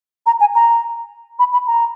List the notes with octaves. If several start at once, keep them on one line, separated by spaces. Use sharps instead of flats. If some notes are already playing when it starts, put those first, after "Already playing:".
A#5
G#5
A#5
B5
B5
A#5